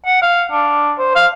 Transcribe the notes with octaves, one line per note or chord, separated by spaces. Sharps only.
F#5
F5
D4
C5
F5